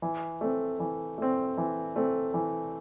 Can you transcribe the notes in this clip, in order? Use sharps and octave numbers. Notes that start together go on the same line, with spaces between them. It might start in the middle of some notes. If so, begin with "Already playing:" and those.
E3
A3 C4
E3
A3 C4
E3
A3 C4
E3